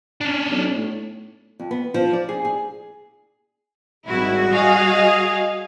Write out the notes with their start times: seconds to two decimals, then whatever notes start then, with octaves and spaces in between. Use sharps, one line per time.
0.21 C#4 D4
0.51 B1
0.76 A2
1.60 F2
1.71 B3
1.94 F3
2.13 D5
2.29 G#4
2.45 G#4
4.07 G#1 G3 E4 F#4
4.51 G#4 D#5 F5